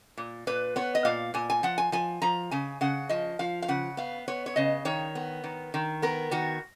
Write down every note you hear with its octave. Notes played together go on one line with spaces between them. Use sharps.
A#2
A#2 B4
B3 C#5
D#5
A#2 F5
A#2 G#5
G#5
F3 F#5
G#5
F3 G#5
F3 A#5
C#3 G#5
C#3 F#5
F3 D#5
F3 F5
F5
C#3 F#5
B3 F5
B3 C#5
C#5
C#3 D#5
D#3 C#5
B3
D#3
D#3
B3 A#4
D#3 F#4